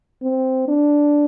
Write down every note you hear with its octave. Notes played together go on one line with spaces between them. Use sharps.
C4
D4